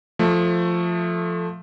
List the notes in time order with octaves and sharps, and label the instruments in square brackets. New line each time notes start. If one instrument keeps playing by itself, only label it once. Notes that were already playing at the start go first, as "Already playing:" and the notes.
[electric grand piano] F3 A3